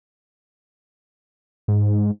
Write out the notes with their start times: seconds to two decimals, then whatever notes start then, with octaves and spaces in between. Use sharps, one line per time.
1.68 G#2